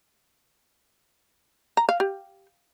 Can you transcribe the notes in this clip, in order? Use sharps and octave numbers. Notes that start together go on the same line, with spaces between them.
A#5
F5
G4